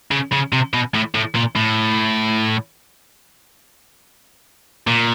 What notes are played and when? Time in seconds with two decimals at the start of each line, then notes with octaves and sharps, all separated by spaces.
0.11 C#3
0.32 C#3
0.53 C3
0.74 B2
0.94 A2
1.15 A2
1.35 A#2
1.56 A2
4.87 A#2